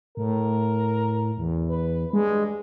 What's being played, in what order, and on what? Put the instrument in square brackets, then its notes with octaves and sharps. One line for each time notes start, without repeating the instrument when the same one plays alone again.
[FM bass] A2 [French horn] A#4
[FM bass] E2
[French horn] B4
[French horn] G2 [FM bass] G#3